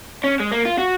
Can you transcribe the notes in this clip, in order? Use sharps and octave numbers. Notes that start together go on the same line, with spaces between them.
C#4
G#3
A#3
F4
F#4